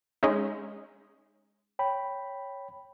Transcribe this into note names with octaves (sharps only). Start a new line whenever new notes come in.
G#3 C#4 D#4
C#5 G5 B5